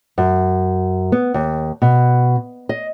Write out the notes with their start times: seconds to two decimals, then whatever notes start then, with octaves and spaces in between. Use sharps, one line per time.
0.18 F#2
1.12 B3
1.34 D#2
1.82 B2
2.69 D#5